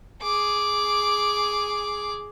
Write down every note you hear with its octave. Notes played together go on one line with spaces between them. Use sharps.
G#4 D6